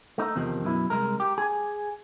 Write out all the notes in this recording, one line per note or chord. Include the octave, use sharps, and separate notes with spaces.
A3 D#4
E2 C3 D#3 F3
F#2 B2 E4
C2 G#3 A#4
G4
G#4 G#5